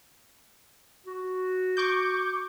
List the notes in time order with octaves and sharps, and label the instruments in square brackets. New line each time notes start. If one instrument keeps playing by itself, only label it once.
[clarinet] F#4
[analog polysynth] C#6 D6 G6